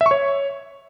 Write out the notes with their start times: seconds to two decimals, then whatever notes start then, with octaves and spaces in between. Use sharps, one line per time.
0.01 E5
0.06 C#6
0.11 C#5